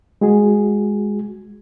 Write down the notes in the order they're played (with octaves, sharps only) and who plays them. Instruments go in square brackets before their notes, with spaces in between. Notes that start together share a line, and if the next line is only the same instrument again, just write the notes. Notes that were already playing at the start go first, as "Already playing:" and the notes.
[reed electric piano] G#3 F#4 G#4